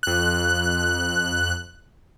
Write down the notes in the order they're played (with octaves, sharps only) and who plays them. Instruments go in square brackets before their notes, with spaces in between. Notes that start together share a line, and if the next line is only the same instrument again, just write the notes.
[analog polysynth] F2 F#6